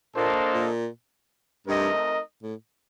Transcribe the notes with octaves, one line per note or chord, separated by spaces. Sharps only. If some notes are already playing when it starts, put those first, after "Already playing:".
A#2 A#3 D4 A4 C5 D#5
A#2
G2 A3 C4 D#4 A#4 D#5
A2